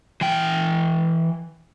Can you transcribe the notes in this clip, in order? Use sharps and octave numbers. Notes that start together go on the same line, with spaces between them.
E3 G5